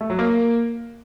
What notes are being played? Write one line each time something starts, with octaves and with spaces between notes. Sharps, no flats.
A3
F#3
A#3